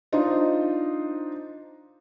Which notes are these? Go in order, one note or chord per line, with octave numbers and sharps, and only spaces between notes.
D4 D#4 F4 C5 D#5